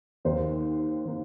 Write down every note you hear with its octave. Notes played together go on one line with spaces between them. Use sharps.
D#2 D#3 A#3 C5
D#3 A#3